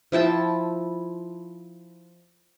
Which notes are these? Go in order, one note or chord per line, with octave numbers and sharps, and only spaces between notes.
F3 E4 G5 A5